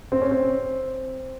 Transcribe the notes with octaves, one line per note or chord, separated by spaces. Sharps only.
C4
C#4
C4